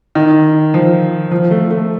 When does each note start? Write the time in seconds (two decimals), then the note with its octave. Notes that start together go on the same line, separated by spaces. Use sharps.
0.15 D#3
0.74 F3
1.31 F3
1.51 A3
1.71 A3